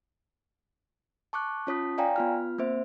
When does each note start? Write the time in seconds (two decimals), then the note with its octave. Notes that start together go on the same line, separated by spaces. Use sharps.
1.33 A5 C#6 D6 F#6
1.67 C#4 F4 C#5 A5 D#6 B6
1.98 C#5 D5 F5 G5 G#5 A#5
2.16 B3 F4 F6
2.58 A#3 C4 C5 E5